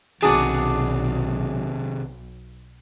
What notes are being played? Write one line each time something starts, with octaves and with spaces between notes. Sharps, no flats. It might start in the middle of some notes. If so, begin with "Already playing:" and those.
B1 C3 D#3 B3 D4 F#4 G#4 D5